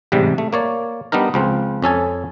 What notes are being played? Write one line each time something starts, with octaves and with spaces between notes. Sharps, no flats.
A1 G#2 C3 G3
A3
A#3 C#5 D5
G3 B3 D4 D#4 A#4
C#2 F3 C4
F2 C#4 A4 G#5